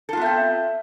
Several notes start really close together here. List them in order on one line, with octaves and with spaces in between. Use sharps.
A4 F4 B3 E5 C4